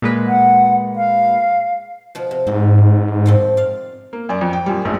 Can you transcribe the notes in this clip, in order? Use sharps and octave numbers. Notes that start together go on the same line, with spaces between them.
A#2 G#3 B4
F#5
F5
B2 F3
C3
G#2 C4
D#3 F3 C4
D5 F5
A#3
F#2 D5
F2
G5
F#2 A#2 G3
A#1 G#2 A3